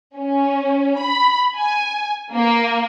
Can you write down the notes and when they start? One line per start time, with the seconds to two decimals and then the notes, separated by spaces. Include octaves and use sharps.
0.17 C#4
0.99 B5
1.58 G#5
2.34 A#3